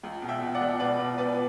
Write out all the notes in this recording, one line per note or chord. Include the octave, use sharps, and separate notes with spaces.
C#2
B2
E5 G5
B2
D5 F#5
C#2
B2 B4 D5
B2
B3 B4 D5